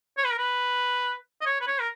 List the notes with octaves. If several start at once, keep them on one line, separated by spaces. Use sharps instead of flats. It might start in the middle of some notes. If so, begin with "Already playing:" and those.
C#5
B4
A#4
B4
D#5
C#5
B4
C#5
A#4